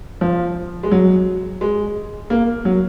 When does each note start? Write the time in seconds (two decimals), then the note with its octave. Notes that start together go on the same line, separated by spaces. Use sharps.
0.21 F3
0.83 G#3
0.91 F#3
1.61 G#3
2.30 A#3
2.65 F#3